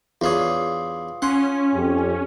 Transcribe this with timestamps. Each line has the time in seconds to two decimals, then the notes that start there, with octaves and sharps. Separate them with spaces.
0.21 E2 D4 F4 C#5 F5 D#6
1.22 C#4 F#5 C6
1.75 F2 G4